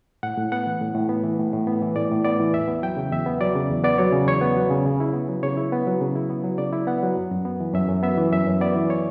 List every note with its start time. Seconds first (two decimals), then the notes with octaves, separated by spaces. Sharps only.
0.23 A2 F#5
0.37 A2
0.52 B3 F#5
0.67 E3
0.81 A2
0.94 A2
1.09 B3
1.24 E3
1.39 A2
1.53 A2
1.67 B3
1.82 E3
1.96 A2 D5
2.11 A2
2.25 B3 D5
2.40 E3
2.54 E2 E5
2.68 B3
2.82 F#3 G5
2.97 C#3
3.11 E2 E5
3.26 B3
3.41 F#3 D5
3.55 C#3
3.69 E2
3.84 B3 D5
3.98 F#3 C#5
4.13 C#3
4.27 E2 C#5
4.41 B3
4.57 F#3
4.70 C#3
4.85 C#3
5.00 E4
5.14 B3
5.29 F#3
5.43 C#3 C#5
5.57 E4
5.72 B3
5.87 F#3
6.01 C#3
6.15 E4
6.30 B3
6.44 F#3
6.58 C#3 D5
6.73 E4
6.87 B3 F#5
7.03 F#3
7.17 F#2
7.31 F#2
7.45 B3
7.60 E3
7.74 F#2 E5
7.89 F#2
8.03 B3 E5
8.17 E3
8.31 F#2 E5
8.47 F#2
8.61 B3 D5
8.76 E3
8.90 C#5